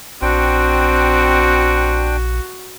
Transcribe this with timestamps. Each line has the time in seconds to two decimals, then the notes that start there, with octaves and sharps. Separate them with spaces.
0.22 A#1 C4 D4 F#4 G5